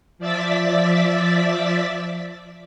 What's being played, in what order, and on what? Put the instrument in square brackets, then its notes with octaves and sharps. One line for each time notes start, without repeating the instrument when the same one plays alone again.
[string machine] F3 D5 E5 A6 B6